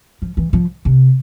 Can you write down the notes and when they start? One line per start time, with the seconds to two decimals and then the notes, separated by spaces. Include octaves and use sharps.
0.22 F3
0.37 E3
0.53 F3
0.85 C3